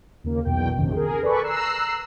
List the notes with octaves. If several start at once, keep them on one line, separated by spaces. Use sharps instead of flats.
D#2 C#3 A#3
B1 E2 B2 G5
A#1 F#2 C3 D#3
G#4 A#4
A4 B4 D5 G#5 B5 C#6
A#5 E6 F#6 C7